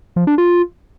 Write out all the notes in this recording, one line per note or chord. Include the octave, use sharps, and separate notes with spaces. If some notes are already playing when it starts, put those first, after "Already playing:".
F3
D4
F4